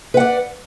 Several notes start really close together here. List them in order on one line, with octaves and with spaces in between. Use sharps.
B4 F#5 D5